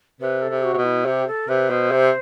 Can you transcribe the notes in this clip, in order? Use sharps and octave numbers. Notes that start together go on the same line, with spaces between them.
C3 B4
A4
C3
F#4
C3
B2
E4
C3 G4
A4
C3 B4
B2 C5
C3